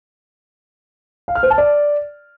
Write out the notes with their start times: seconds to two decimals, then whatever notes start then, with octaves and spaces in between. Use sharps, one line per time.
1.28 F5
1.35 F6
1.43 C5
1.50 A5
1.58 D5